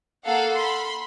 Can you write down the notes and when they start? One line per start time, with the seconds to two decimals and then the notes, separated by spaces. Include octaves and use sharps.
0.25 A#3 A4 F5 F#5
0.54 B5 C6